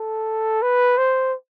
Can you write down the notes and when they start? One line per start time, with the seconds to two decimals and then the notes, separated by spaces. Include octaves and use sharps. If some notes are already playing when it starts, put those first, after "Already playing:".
Already playing: A4
0.62 B4
0.98 C5